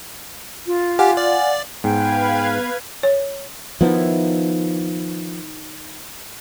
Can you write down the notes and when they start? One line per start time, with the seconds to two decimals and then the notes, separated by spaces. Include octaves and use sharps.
0.67 F4
0.99 G4 F5 F#5 G#5
1.17 D5
1.84 G#2 B3 B4 F5 G5 G#6
3.03 C#5
3.81 D#3 F3 B3 D#4 E4